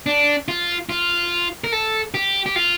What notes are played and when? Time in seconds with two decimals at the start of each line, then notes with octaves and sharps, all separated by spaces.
0.06 D4
0.48 F4
0.89 F4
1.64 A#4
1.72 A4
2.14 G4
2.46 G4
2.56 F4